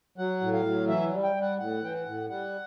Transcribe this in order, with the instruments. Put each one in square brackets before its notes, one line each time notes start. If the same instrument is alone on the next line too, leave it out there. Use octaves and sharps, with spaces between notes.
[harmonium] F#3 F#5
A2
F5
F#3
E3 E5
G3
G5
G3
F#5
A2 F#5
E3 G5
F#5
A2
G3 F#5